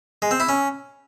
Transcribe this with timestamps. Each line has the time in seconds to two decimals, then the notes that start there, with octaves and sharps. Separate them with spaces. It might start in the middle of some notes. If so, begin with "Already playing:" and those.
0.22 G#3
0.31 C4
0.40 E4
0.49 C#4